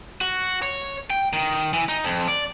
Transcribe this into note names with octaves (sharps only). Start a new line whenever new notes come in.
F#4
C#5
G5
D#3
E3
D#4
F2
D5